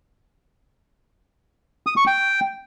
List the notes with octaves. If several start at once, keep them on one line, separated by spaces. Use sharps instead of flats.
D#6
C#6
G5